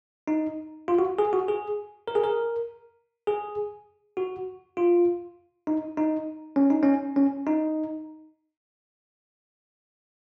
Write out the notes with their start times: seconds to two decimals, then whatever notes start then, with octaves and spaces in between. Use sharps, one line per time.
0.28 D#4
0.88 F4
0.99 F#4
1.19 G#4
1.33 F#4
1.48 G#4
2.08 A#4
2.15 G#4
2.24 A#4
3.27 G#4
4.17 F#4
4.77 F4
5.67 D#4
5.97 D#4
6.56 C#4
6.70 D#4
6.83 C#4
7.16 C#4
7.47 D#4